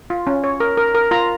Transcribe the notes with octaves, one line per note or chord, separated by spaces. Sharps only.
F4
C#4
C#5
A#4
A#4
A#4
F4 A#5